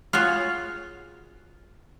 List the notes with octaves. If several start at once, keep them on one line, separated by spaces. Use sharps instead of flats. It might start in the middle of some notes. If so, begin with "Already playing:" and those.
F4 F#4 G#4 C#5